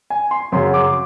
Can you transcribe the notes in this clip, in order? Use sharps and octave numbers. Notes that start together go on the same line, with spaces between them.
G#5
C6
F#2 C#3 F#3 C6
D6